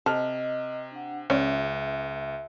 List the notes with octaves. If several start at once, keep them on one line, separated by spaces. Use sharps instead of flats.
C3 A4 D#5 F6
D4 F#5
C#2 C#4 D5 E5